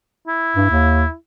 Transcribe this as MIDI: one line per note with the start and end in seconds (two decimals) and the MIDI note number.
0.28 1.14 64
0.56 0.67 43
0.70 1.06 39